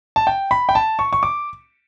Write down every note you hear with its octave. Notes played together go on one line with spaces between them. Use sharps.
A5
G5
B5
G5
A5
C#6
C#6
D6